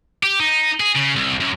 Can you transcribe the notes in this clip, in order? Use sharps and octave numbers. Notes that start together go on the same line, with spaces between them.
G4
D#4
G#4
C#3
C2
F#2